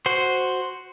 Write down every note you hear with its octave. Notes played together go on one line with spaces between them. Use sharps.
F#4 C5 C6